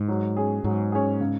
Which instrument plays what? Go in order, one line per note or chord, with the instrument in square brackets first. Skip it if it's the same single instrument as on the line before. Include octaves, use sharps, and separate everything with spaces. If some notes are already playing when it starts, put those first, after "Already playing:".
Already playing: [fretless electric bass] G#2
[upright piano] F#3
C#4 G#4
[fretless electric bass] G#2 [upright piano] F#3
[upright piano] C#4 G#4
C#3